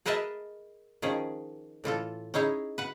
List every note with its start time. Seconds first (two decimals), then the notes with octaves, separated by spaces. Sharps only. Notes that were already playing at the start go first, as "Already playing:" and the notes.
0.06 G#4 A#4 B4 D#5 E5 A5
1.02 D#3 F3 C#4 G#4
1.84 A2 E3 F4 A4
2.34 C#4 D#4 E4 G#4 C#5
2.78 B4 F#5